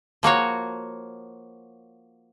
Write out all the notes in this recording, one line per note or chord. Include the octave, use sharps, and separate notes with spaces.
F3 A#3 F#4 C#5